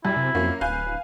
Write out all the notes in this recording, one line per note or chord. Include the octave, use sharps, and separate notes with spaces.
F#2 G3 E4
C3
F2 F#3 A#3 C#4
D1 B4 F5 G#5 G6